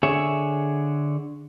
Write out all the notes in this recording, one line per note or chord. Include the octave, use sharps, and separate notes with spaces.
D3 G#4 C#5 E5